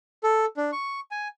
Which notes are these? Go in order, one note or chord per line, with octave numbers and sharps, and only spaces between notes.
A4
D4
C#6
G#5